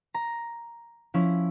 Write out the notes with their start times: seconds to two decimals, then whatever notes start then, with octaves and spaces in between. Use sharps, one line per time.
0.14 A#5
1.14 F3 C#4 E4